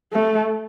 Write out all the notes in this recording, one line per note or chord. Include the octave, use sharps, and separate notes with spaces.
A3